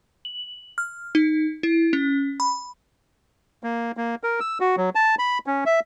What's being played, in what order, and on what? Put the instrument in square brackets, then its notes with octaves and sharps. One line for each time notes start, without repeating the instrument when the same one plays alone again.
[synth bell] F#7
F6
D#4
E4
C#4
B5
[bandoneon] A#3
A#3
A#4
E6
F#4
F#3
A5
B5
C#4
E5